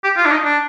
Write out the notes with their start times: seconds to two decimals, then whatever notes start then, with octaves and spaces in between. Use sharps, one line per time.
0.04 G4
0.17 F4
0.25 D4
0.31 D#4
0.45 D4